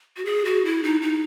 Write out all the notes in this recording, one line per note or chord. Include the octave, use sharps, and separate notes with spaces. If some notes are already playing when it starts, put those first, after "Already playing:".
F#4
G#4
F#4
E4
D#4
D#4